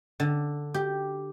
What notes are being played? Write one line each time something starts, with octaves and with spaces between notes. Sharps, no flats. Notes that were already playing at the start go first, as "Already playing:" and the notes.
D3
G4